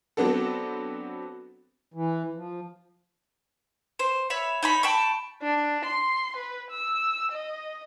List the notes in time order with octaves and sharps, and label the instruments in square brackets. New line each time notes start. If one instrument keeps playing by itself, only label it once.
[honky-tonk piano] F#3 B3 C4 D4 F#4 A4
[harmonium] E3
F3
[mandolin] C5
C#5 E5 B5
D#4 C#5 B5
G5 A5 B5 C#6
[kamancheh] D4
C6
B4
E6
D#5